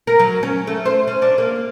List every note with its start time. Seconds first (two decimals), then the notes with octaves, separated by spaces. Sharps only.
0.07 A#4
0.20 F#3
0.43 C#4
0.67 A3
0.85 C5
1.07 C#4
1.22 D4
1.38 A#3